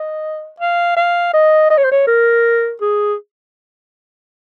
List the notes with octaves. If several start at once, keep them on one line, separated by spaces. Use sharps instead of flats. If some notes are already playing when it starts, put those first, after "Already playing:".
Already playing: D#5
F5
F5
D#5
D#5
C#5
C5
C#5
A#4
G#4